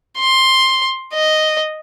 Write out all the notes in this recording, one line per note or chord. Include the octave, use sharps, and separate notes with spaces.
C6
D#5